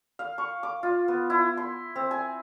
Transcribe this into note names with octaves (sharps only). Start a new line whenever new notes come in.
F5
C#6
D6
F4
B3
E4
C6
C4
G#5